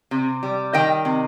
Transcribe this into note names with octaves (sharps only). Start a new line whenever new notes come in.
C3
G3
D#3 D#5 G5
C3